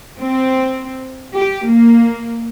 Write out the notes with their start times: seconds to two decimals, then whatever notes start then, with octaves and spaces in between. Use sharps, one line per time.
0.21 C4
1.35 G4
1.68 A#3